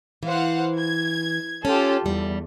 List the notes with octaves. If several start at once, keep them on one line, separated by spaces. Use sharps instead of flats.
E3 C5 F5 F#5
G#6
C#4 F4 G4 A4
E2 G3